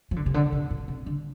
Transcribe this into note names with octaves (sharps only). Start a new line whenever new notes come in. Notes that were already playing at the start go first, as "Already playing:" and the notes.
F3
D3
C3
D3
C3
A#2
C3
D3